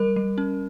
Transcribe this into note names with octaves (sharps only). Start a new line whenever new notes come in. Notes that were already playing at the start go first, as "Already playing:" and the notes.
Already playing: G3 A#4
G3
C#4